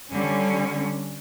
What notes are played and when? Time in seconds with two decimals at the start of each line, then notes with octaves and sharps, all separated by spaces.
0.10 D3 G3 C#4